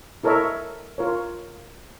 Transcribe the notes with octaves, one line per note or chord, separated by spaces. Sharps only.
E4 A4 A#4 C#5 D#5 E5
F4 A#4 C#5